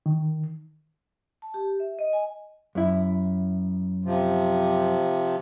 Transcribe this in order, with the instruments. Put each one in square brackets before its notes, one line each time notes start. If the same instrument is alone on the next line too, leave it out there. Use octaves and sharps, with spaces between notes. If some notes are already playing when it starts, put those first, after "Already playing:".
[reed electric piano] D#3
[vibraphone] A5
G4
E5
D#5
G#5
[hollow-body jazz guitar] F#2 E4
[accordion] C3 F3